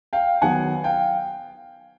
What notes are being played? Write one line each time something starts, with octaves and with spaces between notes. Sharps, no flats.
F5 G5
D#3 F#3 B3 F#5 G#5
F5 G5